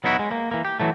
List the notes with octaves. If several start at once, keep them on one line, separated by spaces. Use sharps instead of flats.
F#3 B3 D#4 E4 F#4
G#3
A#3
E3 A#3
G4
E3 F#3 A3